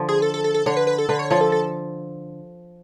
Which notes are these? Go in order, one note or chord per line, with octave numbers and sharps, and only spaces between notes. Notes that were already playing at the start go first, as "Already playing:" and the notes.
Already playing: D3 F3
G#4
A4
A4
A4
A4
D3 C#5
B4
B4
A4
D3 B4
C#5
F3 C#5
A4
A4